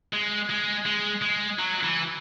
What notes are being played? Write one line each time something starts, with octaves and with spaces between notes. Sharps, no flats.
G#3
G#3
G#3
G#3
F#3
E3